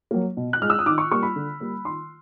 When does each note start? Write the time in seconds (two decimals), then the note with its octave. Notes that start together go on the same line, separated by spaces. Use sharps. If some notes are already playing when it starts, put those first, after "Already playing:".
0.11 F#3 A#3
0.37 B2
0.53 F#6
0.62 G#3 F6
0.70 E6
0.79 D#6
0.86 D#3 D6
0.98 C#6
1.11 G3 A#3 C#6
1.23 B5
1.36 D3
1.60 G3 A#3
1.85 D#3 C6